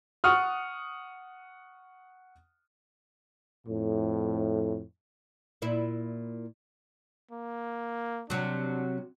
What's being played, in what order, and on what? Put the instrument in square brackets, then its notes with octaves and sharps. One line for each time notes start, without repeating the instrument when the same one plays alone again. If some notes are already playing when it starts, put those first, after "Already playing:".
[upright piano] F#5 C#6 D#6 F6
[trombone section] F2 A2
[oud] A#2 E4
[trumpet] A#3
[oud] C3 F#3 [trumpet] D4